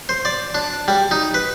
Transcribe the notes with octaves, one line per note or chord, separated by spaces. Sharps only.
C5
D5
D4
G3
D#4
B4